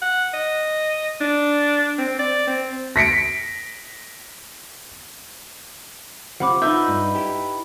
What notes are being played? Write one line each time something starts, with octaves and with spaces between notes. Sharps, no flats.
F#5
D#5
D4
C4
D5
C4
A#6 B6 C#7 D7
C3 F3 F#5 B5 D6
D#4 F4 B4 E5 G6
G2
E4 G4